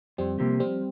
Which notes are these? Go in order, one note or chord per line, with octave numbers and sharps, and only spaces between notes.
F2 G3 C4
C3 F3 A#3 G4
F3 G3 C4